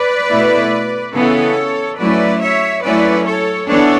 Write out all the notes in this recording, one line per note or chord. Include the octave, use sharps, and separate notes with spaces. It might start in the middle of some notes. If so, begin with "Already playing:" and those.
Already playing: B4 D5
B2 A3 E4
C#3 E3 B3 A4 C#5
F#3 A3 C#4 E4 B4 D5
C#5 E5
F#3 A3 C#4 E4 B4 D5
A4 C#5
E3 B3 D4 A4 C#5